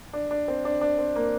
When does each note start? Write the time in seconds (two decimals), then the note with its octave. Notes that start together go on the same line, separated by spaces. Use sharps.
0.13 D4
0.31 D4
0.48 C4
0.65 D4
0.81 D4
0.98 C4
1.16 A#3